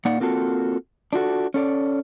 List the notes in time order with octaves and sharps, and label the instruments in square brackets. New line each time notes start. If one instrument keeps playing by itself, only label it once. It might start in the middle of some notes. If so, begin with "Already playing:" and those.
[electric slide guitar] A#2 A#3 D#4 D5 F#5
A#3 C4 F4 F#4 A4
D4 F4 F#4 A4
C#4 A4 D5